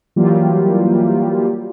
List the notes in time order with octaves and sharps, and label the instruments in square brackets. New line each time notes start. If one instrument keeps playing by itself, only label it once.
[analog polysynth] E3 F#3 G3 A#3 F4 G4